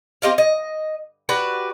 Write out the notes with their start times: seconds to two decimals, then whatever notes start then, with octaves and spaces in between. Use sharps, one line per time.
0.22 C4 G4 D#5 F5
0.38 D#5
1.29 F#4 G4 B4 D5